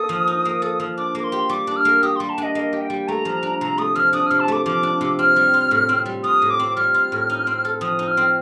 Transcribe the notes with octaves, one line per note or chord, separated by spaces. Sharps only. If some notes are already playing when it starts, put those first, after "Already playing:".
Already playing: A#3 A4 D#6
F3
D#4
A#3
A4
F3
D4 D6
A#3 D6
C6
G4
G3 D6
D4
F6
A#3
G4 D#6
G3 C6
A5
D4 D#5
A#3 D#5
G4
G5
G3
A3 A#5
F3
D4
C3 A#5
A3 D#6
F3 F6
D4 D#6
C3 F6
A5
A3 D6
F3 D6
D4
C3
C4 F6
G3
F4
A2
C4
G3
F4 D#6
A2
D6
C4
G3 F6
F4
A2
D#4
C4
A4
F3 D#6
D#4
F6
C4